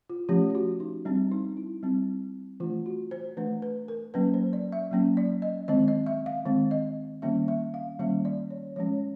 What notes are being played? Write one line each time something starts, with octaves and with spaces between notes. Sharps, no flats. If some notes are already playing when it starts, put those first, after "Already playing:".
F4
F3 A3 C#4 G4
G4
F#4
D#4
G3 C4 D4
D#4
E4
G3 C4
E3 A3 D4 F4
F#4
C5
E3 A3 D4 B4
B4
A#4
F#3 A#3 C#4 B4
C5
D5
E5
F#3 A#3 C#4
D5
D#5
D#3 G#3 C4 D#5
D#5
E5
F5
D#3 G#3 C4
D#5
D#3 G3 A#3 C#4 E5
E5
F5
D#3 G3 A#3 C#4 E5
D5
C#5
F3 G#3 C#4 C#5